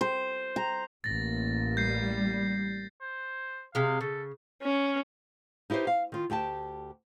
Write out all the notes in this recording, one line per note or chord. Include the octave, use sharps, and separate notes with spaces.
C5
A#5
A1 A#3 A6 A#6
G3 G6 C7
C5
C3 G#3 F5
C#3 A4
C#4
D#4 E4 G4 B4 C5
F5
D#3 F4
D2 G4 G5 A5